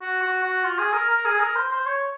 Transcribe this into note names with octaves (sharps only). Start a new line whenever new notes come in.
F#4
F#4
F#4
F4
G#4
A#4
A#4
G#4
A#4
C5
C5
C#5